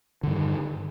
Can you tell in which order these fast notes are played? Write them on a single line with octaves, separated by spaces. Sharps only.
D3 G2 D#3